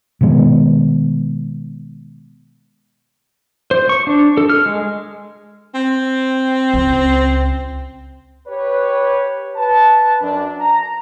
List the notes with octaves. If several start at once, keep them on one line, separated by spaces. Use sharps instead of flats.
B2 D#3 G#3 B3
C5
C#6
D4
A4
F6
G#3
C4
C#2
G4 B4 C#5
B4 A5
F#2 D4
A#5